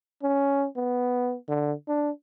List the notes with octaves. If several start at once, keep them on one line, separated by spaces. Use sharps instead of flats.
C#4
B3
D3
D4